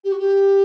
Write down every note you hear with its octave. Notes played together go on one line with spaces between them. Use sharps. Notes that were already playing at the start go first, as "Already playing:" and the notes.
G4
F#4
G4